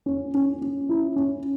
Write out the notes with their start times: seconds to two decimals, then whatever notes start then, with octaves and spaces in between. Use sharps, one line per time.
0.06 C#4
0.34 C#4
0.62 C#4
0.89 E4
1.16 C#4